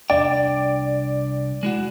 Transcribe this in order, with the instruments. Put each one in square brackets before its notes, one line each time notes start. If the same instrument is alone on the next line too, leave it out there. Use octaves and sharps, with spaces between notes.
[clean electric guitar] C2 D4 G5 [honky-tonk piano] D5
[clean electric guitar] G#3 E4 F#4